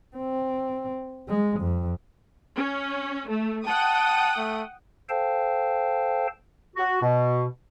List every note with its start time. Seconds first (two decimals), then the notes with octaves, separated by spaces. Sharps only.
0.16 C4
1.28 G#3
1.60 F2
2.56 C#4
3.28 A3
3.67 F#5 G5 A5 D#6
4.37 A3
5.09 A4 C5 F5 G5 A5
6.76 F#4
7.02 B2